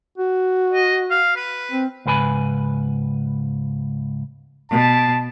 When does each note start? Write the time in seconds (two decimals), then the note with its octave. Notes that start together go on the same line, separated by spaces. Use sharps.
0.18 F#4
0.73 D#5
1.11 F5
1.36 B4
1.71 C4
2.06 C#2 G#2 B4 G#5 B5
4.70 B2 A5